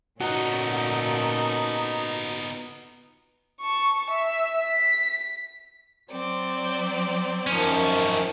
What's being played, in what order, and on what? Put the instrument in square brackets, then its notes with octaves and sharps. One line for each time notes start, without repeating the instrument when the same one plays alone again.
[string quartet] A#2 C#4 A4 [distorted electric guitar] B3 F4 [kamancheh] D#4 [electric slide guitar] F#4
[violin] A5 C#6
E5
B6
[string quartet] F#3 C4 D5
[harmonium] F#2 D#3 F3 [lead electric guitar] C#4 D#4